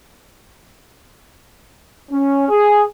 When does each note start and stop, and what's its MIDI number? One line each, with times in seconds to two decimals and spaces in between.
2.11 2.48 61
2.49 2.83 68